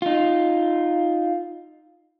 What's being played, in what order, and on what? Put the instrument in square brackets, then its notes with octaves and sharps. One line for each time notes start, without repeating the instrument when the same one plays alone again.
[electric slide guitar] D#4 F4